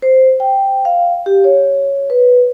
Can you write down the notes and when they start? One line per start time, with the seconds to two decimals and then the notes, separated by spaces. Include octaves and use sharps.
0.02 C5
0.40 G5
0.85 F5
1.26 G4
1.44 C#5
2.10 B4